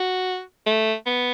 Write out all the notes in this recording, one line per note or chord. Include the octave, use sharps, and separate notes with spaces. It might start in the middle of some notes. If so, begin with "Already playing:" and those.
Already playing: F#4
A3
B3